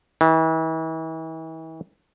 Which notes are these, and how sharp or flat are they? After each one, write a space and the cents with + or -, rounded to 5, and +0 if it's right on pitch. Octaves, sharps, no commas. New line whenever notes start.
E3 -40